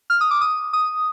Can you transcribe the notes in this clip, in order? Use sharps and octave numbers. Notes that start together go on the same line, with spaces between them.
F6
D#6
D6
D#6
D#6